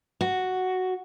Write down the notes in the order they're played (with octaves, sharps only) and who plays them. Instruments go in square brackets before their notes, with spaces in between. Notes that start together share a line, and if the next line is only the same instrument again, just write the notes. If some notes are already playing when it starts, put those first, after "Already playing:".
[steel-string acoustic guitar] F#4